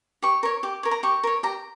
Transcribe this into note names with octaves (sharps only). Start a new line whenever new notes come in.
G4 C#6
A#4 C#5 C#6
G4 D6
A#4 C#5
A#5
G4 C#6
A#4 C#5
G4 A#5